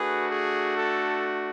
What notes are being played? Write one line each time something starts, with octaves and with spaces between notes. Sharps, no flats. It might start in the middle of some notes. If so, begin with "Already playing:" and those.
Already playing: A3 D4 F#4 G#4 B4
G#4
A4